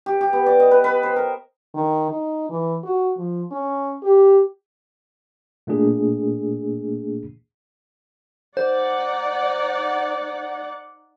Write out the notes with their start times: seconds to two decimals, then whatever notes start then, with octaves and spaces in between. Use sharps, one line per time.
0.06 G4
0.21 G4
0.33 B3
0.46 D5
0.60 D#5
0.71 B4
0.84 B4
1.03 C5
1.16 A#4
1.74 D#3
2.10 D#4
2.49 E3
2.84 F#4
3.18 F3
3.51 C#4
4.03 G4
5.67 A#2 A3 A#3 D4 G#4
8.57 D#4 C5 D5 F#5